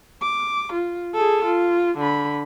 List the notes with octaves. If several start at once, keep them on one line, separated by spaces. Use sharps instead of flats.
D6
F4
G#4 A4
F4
D3 B5